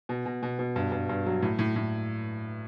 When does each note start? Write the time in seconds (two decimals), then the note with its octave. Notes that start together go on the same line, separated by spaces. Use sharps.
0.09 B2
0.26 B2
0.43 B2
0.59 B2
0.76 G2
0.92 G2
1.09 G2
1.26 F#3
1.42 A2
1.59 A2
1.76 A2